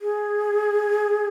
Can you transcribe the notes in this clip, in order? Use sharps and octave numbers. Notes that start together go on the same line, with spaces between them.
G#4